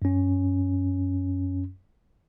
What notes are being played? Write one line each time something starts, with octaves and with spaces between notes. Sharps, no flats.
F#2 C#4